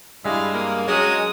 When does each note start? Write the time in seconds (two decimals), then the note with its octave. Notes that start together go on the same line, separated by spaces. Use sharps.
0.24 G2 G3 G#3 E4 E5 F5
0.54 A#3 D#6
0.88 F#3 G#3 C#4 D#6